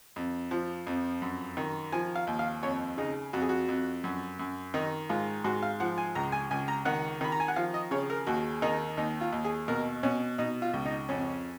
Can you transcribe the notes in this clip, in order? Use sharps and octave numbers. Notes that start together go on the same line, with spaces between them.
F2
F3
F2
F#2
D#3
F3 G#5
F5
D#2
F5
F2 C#5
C#3 D#4
F2 F#4
G#4
F#4
F2
F#2
F#2
D#3 D#4
G#2 F4
G#2 F#4
F5
F3 F#5
G#5
C#2 A#5
G#5
C#2 G#5
A#5
D#3 F#5
D#3 B5
A#5
G#5
F#5
F3 F5
D#5
C#3 C#5
A#4
D#2 F#4
D#3 D#4
D#2 D#4
F4
D#2
G#4
B2 A#4
B2 C#4
B2 D#4
F4
C#2
D#4
F2 C#4